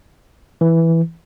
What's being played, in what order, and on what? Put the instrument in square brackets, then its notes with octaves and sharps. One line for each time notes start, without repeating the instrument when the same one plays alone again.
[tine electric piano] E3